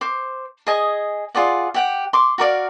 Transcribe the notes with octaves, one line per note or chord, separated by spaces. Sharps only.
C5 D6
G#4 D#5 G#5
F4 G#4 D5 F#5
G4 F#5 G5
C6 D6
F#4 A#4 D5 F5